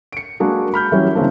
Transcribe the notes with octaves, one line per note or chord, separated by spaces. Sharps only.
C#7 D7
G#3 A#3 D4 F#4 G#4
B5 F6 G6
E3 F#3 G3 C#4
C#3 E3 A#3 C4 D4